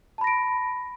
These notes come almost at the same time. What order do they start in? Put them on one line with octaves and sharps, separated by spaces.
A5 B5 A#6 D7